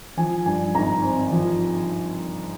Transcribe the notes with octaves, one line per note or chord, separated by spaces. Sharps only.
F3 G#5
G2 G#5
G#1 A#5
C4
F3